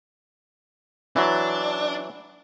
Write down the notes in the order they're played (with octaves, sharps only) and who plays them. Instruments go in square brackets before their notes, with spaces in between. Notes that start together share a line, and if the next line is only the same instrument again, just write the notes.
[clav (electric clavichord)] E3 F#3 [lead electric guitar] D4